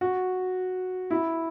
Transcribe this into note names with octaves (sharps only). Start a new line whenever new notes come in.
F#4
E4